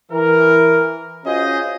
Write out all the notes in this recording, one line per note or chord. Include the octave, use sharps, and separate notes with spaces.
E3 A#4
C#4 F4 F#4 G#4 C5 D#5